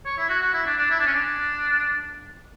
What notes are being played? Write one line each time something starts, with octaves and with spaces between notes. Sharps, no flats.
C#5
E4
F#4
F#4
E4
D4
D4
E4
D4
C#4
D4